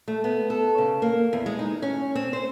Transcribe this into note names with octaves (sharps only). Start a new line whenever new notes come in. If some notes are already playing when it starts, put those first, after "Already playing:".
A3
B3
A4
C#3
A#3
E2
G#3
D#4
C#4
C4
C5